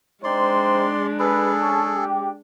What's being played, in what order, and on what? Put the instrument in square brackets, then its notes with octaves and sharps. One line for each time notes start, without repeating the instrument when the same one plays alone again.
[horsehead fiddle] G#3 D4 [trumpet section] C4 D#4 C5 [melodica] D5 C6
[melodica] G#4 A4 [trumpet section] B4
[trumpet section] C#4 A5
G4